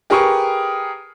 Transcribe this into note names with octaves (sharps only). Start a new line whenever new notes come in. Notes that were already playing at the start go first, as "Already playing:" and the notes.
G4 G#4 A#4 B4 C#6